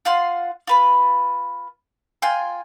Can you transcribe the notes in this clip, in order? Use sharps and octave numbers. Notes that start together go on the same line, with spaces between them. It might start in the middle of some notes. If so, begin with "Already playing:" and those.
F4 F5 F#5 C6
F4 B4 B5
F4 G5 G#5 C6